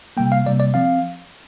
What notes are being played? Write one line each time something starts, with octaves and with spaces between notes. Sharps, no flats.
C3 G3 A#3 G5
F5
C3 G3 A#3 D5
D5
F3 C4 F5